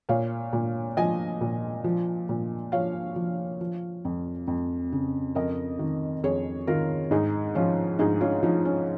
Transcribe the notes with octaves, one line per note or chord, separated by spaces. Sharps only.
A#2 C#5 F5
A#2
F3 D#5 G#5
A#2
F3
A#2
F3 C#5 F5
F3
F3
F2
F2
C#3
F2 A#4 D#5
D#3
F2 G#4 C#5
D#3 F4 A#4
G#2 D#4 G#4
F3 C#4 F4
G#2 D#4 G#4
C#4 F4
F3 D#4
C#4